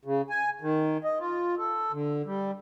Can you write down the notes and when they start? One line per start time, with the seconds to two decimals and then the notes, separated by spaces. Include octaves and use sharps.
0.05 C#3
0.30 G#5
0.61 D#3
1.04 D#5
1.19 F4
1.58 A4
1.92 D3
2.26 G3